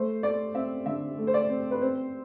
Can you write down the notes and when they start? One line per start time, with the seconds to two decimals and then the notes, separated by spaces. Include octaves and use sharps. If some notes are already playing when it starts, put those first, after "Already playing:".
Already playing: A3 C5
0.23 A3 D5
0.55 C4 E5
0.86 D3 E5
1.18 A3
1.27 C5
1.34 D5
1.50 C4
1.71 B4
1.81 C4 C5